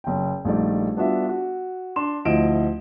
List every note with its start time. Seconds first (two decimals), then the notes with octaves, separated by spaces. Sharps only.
0.04 F#1 G5
0.45 A#1 G3 A3 D#4 D5
0.96 G3 B3 D4 F4 F#4 E5
1.29 F#4
1.96 D4 C6 E7
2.25 D2 F3 E4 D#5 D7 E7